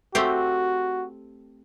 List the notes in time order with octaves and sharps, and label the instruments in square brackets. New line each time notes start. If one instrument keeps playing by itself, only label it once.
[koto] A3 C4 G4 [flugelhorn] F#4